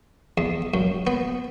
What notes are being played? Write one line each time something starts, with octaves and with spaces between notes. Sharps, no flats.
E2
F#2
B3